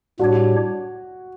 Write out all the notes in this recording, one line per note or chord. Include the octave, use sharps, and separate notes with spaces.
A2 G3 D4 F#4 G4 C#5